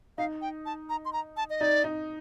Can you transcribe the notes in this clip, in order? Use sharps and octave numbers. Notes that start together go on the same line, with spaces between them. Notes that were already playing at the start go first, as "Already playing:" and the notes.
D#4 F5
G5
A5
A#5
C6
A#5
A5
D#5
D#4 D5
D#4